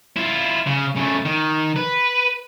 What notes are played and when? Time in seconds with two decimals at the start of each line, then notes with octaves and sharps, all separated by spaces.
0.17 E4 F4
0.67 C#3
0.97 C#3 A3
1.25 D#3
1.76 B4